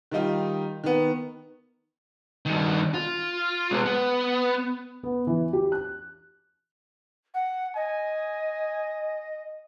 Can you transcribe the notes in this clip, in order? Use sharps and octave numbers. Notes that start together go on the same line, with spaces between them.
D#3 G3 D#4 F4
D#3 B3
G2 D#3
F4
G#3 B3
B3
B3
E3
G4
F#6
F#5
D#5 G#5